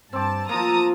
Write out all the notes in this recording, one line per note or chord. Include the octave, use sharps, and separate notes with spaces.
G2 C4 A5 D6
F3 A#3 A5 A#5 D#6